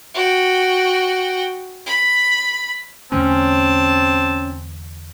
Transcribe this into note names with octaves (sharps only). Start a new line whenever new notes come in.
F#4 G5
B5
E2 D3 A3 C4 C#4 A5